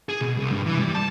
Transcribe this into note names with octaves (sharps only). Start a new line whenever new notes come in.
G#4
B2
C2
G2
E3
G3
A5